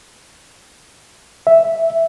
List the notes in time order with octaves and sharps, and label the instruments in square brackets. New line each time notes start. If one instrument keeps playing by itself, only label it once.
[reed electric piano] E5